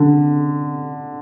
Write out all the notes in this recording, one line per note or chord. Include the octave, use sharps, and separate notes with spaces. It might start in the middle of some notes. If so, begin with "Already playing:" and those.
Already playing: D3